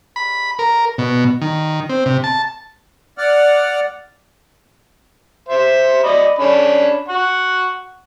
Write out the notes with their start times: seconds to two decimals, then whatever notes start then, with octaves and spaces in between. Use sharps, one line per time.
0.16 B5
0.59 A#4
0.98 B2
1.41 D#3
1.89 C4
2.06 C3
2.24 A5
3.18 D5 F#5 F6
5.49 C5 E5 C6
6.04 D5 D#5 B5
6.39 C#4 D4 B5
7.09 F#5 C#6